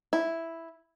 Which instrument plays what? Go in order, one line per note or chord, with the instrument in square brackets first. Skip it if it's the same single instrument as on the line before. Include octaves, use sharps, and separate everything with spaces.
[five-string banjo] E4